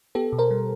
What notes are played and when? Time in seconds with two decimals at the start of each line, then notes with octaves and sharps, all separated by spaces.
0.15 B3 G4 A4
0.32 B2
0.38 A#4 C5
0.51 G3